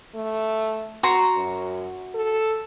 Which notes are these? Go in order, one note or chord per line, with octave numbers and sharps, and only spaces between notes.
A3
F#4 A#5 C6
F#2
A4